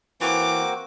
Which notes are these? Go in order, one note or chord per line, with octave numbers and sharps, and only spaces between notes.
E3 A#3 C4 F#4 D6